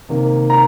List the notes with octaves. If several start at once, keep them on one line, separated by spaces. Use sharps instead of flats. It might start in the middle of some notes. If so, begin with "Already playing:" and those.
C3 D#3 A#3
A#5